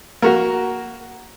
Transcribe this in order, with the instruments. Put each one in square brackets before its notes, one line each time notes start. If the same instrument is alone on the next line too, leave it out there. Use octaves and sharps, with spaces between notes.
[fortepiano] A#3 F#4 A#4